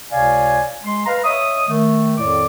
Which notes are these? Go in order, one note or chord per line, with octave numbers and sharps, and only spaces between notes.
C#2 C3 C#5 D5 F5 G#5
G#3 C6
B4 F5 A#5
C#5 D#5 E5 D#6
D#3 A3
F2 A2 D#3 D5 D6